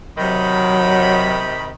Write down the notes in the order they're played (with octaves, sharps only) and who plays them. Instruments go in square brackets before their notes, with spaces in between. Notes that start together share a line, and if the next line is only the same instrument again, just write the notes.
[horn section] C3 D#3 B5 [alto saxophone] F#3